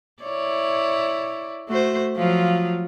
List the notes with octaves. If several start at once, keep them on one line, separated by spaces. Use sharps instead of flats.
E4 C#5 D5
A3 F#4 C5
F3 F#3 F4